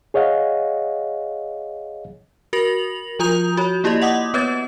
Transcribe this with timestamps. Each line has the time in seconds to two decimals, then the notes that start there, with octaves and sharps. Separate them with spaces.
0.14 G#4 C#5 D#5 F5 F#5
2.53 F#4 A#4 A#6 F7 F#7
3.19 F3 F4 A#5 D#6 G6 F7
3.57 F#4 C#5
3.84 A#3 E4 G4 D5 D#5
4.02 D#5 F#5 D6 D#6
4.34 B3 B4 C#5 D#6 G#6 A6